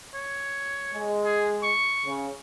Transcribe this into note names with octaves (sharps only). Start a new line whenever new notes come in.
C#5
G#3
G#4
C#6
C#3